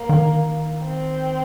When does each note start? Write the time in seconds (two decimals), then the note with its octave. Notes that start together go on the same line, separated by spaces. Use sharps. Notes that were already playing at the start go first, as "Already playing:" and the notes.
Already playing: A#3
0.09 D#3
0.83 C4